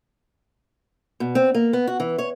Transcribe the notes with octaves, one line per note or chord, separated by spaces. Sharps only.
B2
C4
A#3
B3
F#4
E3
C#5